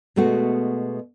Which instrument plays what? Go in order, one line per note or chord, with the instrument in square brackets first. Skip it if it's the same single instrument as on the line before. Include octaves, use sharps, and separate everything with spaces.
[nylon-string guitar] B2 G#3 A3 B3 F#4